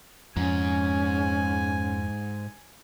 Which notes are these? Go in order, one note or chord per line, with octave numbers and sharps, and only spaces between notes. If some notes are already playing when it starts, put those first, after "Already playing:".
F2 G#2 C#4 G#5